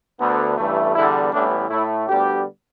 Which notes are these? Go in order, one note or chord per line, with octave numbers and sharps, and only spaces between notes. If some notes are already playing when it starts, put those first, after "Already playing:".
D2 D3 B3
A1 G2 E3 A3
E2 D3 G3 B3 E4
A1 A2 E3 G3 B3 D4
A2 A3 E4
D2 D3 G3 B3 G4